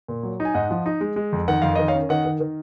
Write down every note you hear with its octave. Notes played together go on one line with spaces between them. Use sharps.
A#2
F#3
D#4
G#5
G#2 D#5 F#5
F3
D#4
G#3
G#3
F2
D#3 F#5
F2 F5
D#3 D#5
C#5 F5
C#4
D#3 D#5 F#5
D#3
D#3